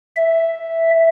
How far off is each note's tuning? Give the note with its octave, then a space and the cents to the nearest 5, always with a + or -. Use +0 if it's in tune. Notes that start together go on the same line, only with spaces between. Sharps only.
E5 +0